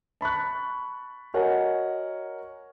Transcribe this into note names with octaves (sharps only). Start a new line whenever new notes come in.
A5 B5 C#6 F#6
F#4 A#4 C#5 D#5 F#5 G#5